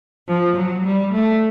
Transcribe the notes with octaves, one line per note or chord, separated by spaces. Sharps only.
F3
F#3
G3
A3